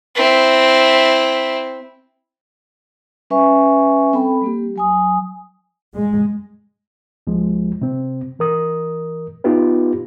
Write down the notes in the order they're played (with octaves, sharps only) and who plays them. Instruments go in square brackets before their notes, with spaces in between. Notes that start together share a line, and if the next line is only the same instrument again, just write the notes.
[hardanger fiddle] C4 E4
[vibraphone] G3 C#4 B4 E5 G#5 C#6
C4 A4 G5 B5
G3 A#3 G4
F#3 G#5 D#6
[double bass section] G#3
[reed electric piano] C2 F3 G#3
C3 C4
E3 A#4 D#6
B3 D#4 F4 G4 B4